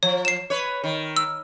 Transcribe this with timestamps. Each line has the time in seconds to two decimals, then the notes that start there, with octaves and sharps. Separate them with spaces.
0.03 F3 C#5
0.25 C7 E7
0.50 B4 C#5
0.84 D#3
1.16 E6